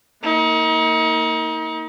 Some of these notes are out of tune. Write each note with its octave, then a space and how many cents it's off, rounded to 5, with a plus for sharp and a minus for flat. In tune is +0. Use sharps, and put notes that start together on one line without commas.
A#3 -15 D#4 +40